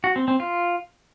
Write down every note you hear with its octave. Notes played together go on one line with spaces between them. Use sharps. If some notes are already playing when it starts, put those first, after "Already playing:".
F#4
C4
C4
F4